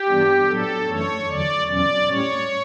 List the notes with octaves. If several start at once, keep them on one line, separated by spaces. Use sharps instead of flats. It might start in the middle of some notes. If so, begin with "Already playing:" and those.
Already playing: G4
G2 E3 G3 B3 D4
A2 F#3 B3 D4 A4
F#2 E3 A3 D4 C#5
E2 D3 F#3 D5
E2 B2 F#3 C#4 D5
A2 G3 C#4 C#5